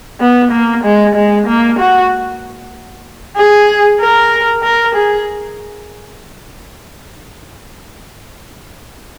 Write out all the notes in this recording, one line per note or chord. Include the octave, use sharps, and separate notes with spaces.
B3
A#3
G#3
G#3
A#3
F#4
G#4
A#4
A#4
G#4